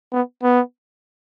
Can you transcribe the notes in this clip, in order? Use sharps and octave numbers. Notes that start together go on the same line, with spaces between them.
B3
B3